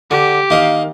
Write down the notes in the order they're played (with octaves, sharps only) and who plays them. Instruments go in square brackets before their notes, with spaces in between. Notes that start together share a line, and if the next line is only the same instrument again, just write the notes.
[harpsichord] D3 [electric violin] G4
[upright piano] D#3 F5 [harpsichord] A#3 D#5